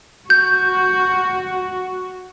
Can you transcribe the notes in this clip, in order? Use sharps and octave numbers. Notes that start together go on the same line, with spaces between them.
F#4 G6